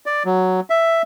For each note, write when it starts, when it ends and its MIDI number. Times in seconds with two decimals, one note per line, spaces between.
0.06 0.23 74
0.25 0.60 54
0.70 1.02 76